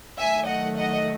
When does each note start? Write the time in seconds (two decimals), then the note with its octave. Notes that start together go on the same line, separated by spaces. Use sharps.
0.18 D#3 F#3 A3 E5 G#5
0.46 D#5 F#5
0.77 D#5 F#5